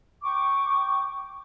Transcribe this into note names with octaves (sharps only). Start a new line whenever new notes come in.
G5 C#6 D6